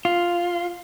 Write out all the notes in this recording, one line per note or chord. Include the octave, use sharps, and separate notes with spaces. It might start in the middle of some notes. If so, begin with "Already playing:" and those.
F4